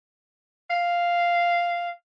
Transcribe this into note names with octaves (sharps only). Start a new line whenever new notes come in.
F5